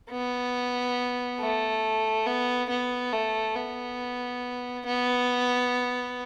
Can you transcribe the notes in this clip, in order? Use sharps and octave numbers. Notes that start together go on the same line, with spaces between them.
B3
A3
B3
B3
A3
B3
B3